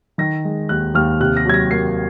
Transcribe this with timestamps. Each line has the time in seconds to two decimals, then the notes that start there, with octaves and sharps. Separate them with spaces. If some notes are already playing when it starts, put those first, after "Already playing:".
0.18 D#3 A#6
0.45 G#3
0.69 D#2 F#6
0.94 D#2 F6
1.20 C3 F#6
1.37 A#6
1.46 F#3 G#6
1.54 A#6
1.71 A#3 C7